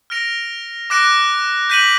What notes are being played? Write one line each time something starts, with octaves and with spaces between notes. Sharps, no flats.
F6 A#6 D7 F7
D6 F#6 A#6 D7
G6 B6 D#7 F#7